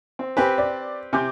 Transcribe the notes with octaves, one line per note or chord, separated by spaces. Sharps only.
C4
C4 G4 B4 G#5
D5
C3 G#5 D6 G6